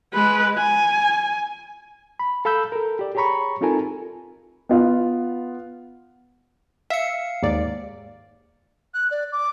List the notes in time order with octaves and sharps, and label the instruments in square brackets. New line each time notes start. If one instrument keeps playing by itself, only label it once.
[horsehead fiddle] G#3 B4
G#5
[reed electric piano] B5
A4 F5 B5 E6 G6
A4 A#4
G4 D5
G4 G#4 C#5 A#5 B5 C#6
C4 D#4 F4 A4 A#4 G#5
[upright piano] B3 F4
[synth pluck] E5 [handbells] F5 C#7
[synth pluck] D#2 G#2 D5
[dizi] F#6
D5
D6